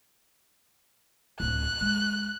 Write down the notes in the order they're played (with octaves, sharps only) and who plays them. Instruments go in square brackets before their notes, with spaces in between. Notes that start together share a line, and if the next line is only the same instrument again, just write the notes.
[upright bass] D1 D2 [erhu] F#6
[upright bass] G#3